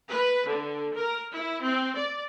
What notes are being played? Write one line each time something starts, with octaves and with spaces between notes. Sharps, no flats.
B4
D3
A#4
E4
C4
D5